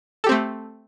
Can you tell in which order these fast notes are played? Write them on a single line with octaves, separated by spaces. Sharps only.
A4 G4 C4 A3